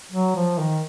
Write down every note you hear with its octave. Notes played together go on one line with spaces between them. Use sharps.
F#3
F3
D#3